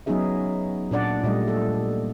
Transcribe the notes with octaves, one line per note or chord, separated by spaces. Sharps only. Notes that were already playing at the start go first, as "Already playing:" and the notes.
F#3 B3 C#4 D#4 G#4 E5
A#2 D4 D5 F#5
A#2 G3 A3 D#5
A4